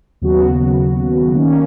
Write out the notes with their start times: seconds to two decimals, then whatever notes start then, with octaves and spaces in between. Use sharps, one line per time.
0.21 D#2 C#3 F#3 B3 F#4
1.34 D#3 A#3 C#4